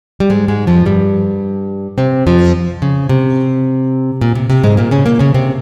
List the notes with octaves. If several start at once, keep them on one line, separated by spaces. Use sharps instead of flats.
G3
G#2 G#3
G#2 G#3
F2 F3
G2 G3
C3 C4
F2 F3
C#3
C3
A#2
C3
C3
G#2 G#3
A#2 A#3
C#3 C#4
A#2 A#3
C#3 C#4
C3 C4